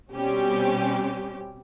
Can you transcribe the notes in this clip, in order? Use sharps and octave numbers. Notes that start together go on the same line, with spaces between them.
B2 G3 C4 C#4 G4